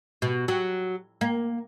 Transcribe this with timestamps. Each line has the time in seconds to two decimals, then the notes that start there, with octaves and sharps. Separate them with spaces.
0.22 B2
0.48 F#3
1.21 A#3